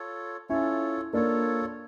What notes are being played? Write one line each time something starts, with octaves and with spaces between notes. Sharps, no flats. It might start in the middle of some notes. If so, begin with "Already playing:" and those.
Already playing: F4 A4 C#5
C#4 E4 F4 A4 C#5
A#3 D4 F4 A4 C#5